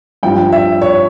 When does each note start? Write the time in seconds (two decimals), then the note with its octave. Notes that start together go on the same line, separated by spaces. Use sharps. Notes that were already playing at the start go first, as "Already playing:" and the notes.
0.23 G2 F3 G5
0.52 E5
0.82 C#5